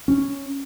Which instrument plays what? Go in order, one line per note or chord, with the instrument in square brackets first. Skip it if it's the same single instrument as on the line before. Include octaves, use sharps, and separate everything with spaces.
[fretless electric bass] C#4